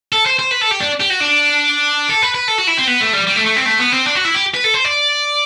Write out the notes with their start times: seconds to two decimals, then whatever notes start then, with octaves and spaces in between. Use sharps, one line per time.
0.12 A4
0.26 C5
0.39 C5
0.51 B4
0.61 A4
0.71 G4
0.80 D4
1.00 G4
1.10 F#4
1.20 D4
2.09 A4
2.22 B4
2.34 B4
2.48 A4
2.58 F#4
2.68 E4
2.78 C4
2.87 B3
3.01 A3
3.13 G3
3.27 G3
3.36 A3
3.46 A3
3.56 C4
3.66 A3
3.79 B3
3.92 C4
4.05 D4
4.15 F#4
4.25 E4
4.34 G4
4.54 B4
4.64 A4
4.74 C5
4.85 D5